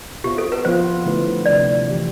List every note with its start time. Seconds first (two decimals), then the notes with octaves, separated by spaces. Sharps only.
0.24 B2 B3 F4 G4 C5 E5
0.38 A4
0.52 B4
0.65 F3 B3 F4 C5
1.06 D3 A3 E4 B4
1.46 C3 F3 B3 D5
1.86 E3 G3 D4 G4